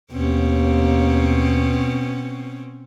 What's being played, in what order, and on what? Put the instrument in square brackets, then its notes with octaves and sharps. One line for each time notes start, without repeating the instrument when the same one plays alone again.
[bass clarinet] D#2 [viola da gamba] B2 C4 C#4